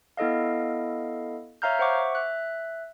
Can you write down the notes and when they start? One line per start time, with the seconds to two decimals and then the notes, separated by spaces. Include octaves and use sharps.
0.17 B3 E4 A4 D#5 F5
1.62 C#5 E5 F5 A#5 F6 G6
1.79 C5 E5 F#5 C#6 D6
2.15 E5 F#6